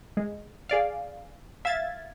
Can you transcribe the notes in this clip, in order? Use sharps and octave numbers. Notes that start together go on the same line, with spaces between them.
G#3
G#4 D5 F5
E5 F5 G#6 A6